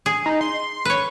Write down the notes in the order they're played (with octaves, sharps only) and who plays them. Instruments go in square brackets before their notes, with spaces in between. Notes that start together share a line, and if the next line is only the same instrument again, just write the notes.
[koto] G#4
[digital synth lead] D#4
C6
[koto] B4 C#5